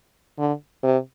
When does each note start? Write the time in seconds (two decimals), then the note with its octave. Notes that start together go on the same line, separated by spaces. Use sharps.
0.39 D3
0.83 C3